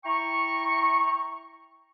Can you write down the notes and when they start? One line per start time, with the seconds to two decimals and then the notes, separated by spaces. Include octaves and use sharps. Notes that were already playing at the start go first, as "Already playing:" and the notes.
0.05 E4 G5 A#5 C#6